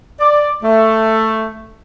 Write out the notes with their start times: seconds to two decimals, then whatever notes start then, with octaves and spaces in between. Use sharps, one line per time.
0.20 D5
0.63 A3